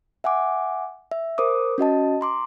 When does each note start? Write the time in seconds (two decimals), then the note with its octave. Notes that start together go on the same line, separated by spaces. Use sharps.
0.24 E5 F#5 G#5 D6
1.12 E5
1.38 A#4 C5 D6 D#6
1.78 C#4 F#4 D#5 A5
2.21 A#5 C6 D6